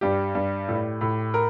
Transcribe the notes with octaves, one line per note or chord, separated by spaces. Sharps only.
G2 G4
G2
A2
A2
A#4